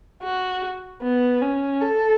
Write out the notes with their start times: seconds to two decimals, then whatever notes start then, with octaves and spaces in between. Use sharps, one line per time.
0.23 F#4
1.02 B3
1.42 C#4
1.81 A4